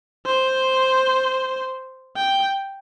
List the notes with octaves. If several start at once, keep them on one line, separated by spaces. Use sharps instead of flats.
C5
G5